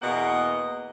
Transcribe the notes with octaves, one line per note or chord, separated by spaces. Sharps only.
E2 B2 A#3 D#5 F#5